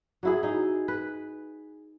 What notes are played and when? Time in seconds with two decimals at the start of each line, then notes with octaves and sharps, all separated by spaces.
0.23 F#3 E4 G#4
0.43 D#4 G#4
0.88 B4